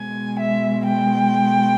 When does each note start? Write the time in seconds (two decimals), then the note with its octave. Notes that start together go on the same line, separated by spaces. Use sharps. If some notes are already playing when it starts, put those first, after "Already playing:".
Already playing: B2 G#3 G#5
0.39 E5
0.87 G5